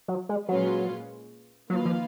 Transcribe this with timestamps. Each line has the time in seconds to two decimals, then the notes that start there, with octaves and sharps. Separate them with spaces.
0.08 F#3
0.29 G#3
0.49 A#2 F#3 G#3 C#4 F4 B4
1.70 D#3 F#3 A#3 F4 B4 F5
1.85 F3